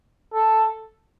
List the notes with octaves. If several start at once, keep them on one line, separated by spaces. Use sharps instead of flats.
A4